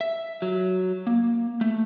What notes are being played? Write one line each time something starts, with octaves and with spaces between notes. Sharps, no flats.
E5
F#3
A#3
A3